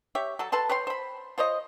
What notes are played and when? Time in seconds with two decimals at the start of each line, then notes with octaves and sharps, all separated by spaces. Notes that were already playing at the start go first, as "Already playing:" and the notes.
0.15 G4 C#5 E5
0.39 F#3 A4
0.52 A4 B4 A5 C6
0.69 B4 C#5 G5 C6
0.87 C5 B5
1.38 F4 C5 C#5 D#5